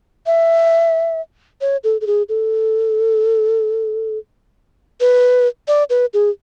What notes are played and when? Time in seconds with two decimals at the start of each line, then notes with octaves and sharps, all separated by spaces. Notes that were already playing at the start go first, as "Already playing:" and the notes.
0.26 E5
1.61 C#5
1.84 A4
2.01 A4
2.07 G#4
2.29 A4
5.00 B4
5.68 D5
5.90 B4
6.14 G#4